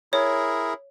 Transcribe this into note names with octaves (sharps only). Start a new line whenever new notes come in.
E4 G#4 A#4 C#5